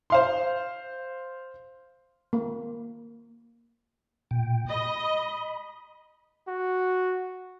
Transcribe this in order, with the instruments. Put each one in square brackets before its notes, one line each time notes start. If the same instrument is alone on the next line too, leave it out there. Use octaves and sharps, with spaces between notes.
[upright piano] C5 F5 C6
[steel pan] A#3
[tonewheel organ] A#2 G5
[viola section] D#5 [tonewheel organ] B5
[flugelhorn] F#4